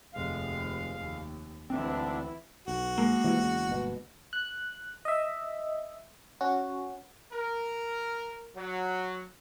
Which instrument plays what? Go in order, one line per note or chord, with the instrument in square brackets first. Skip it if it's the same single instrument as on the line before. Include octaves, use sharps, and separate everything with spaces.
[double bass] F1 D#2 [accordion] G#3 F5
[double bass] D#2
[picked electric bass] D2 C4 [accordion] G#2 D3 D4 [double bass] E3 E4
[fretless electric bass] B1 [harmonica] F#4
[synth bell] G#3 A#3
[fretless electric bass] E3 F3 G3
E2 C#3
G1 B2
[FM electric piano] F#6
D#5 E5
C#4 F#4
[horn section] A#4
F#3